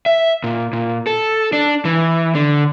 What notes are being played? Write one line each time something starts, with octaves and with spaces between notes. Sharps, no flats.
E5
A#2
A#2
A4
D4
E3
D3